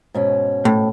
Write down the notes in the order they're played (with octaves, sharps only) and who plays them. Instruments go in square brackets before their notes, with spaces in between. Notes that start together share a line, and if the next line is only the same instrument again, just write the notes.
[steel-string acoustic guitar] G#2 B2 C#4
[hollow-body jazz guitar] A2